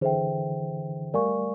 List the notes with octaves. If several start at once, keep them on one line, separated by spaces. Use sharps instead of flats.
D3 E3 G#4 C5 E5 G5
G3 A3 A#4 D5 F5 G#5 C#6